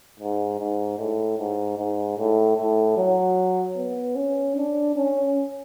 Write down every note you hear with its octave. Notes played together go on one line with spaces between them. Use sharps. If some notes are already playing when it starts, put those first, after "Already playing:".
G#2
G#2
A2
G#2
G#2
A2
A2
F#3
B3
C#4
D4
C#4